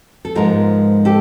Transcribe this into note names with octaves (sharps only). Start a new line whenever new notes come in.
A4
G#2 F3 G#3 B3 G#4 A#4
G4 A4